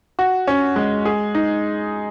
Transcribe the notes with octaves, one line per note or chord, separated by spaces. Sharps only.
F#4
C#4
G#3
G#4
D#4